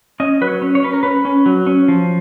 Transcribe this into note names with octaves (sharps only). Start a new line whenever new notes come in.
C#4 D#5
F#3 B4
C#5
C#4
C#5
C#4 B4
A#4
C#4 B4
C#4
F#3
C#4
F3